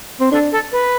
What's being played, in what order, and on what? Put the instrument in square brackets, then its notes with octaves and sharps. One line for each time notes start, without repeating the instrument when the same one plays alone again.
[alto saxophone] C4
[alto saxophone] D4 [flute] A4
[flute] A4
B4